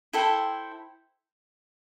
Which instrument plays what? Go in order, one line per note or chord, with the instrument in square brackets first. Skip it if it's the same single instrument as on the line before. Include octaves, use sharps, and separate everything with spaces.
[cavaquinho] E4 A4 C5 G5